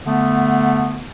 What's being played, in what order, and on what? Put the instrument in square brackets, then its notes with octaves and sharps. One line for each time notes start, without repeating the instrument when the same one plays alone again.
[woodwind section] D3 A3 B3